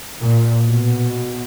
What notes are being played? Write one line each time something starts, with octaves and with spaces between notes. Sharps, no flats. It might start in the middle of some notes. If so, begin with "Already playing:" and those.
A#2
B2